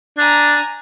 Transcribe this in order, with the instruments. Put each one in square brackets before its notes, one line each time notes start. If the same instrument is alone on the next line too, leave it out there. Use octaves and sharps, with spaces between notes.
[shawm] D4 [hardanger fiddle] G#5 A#5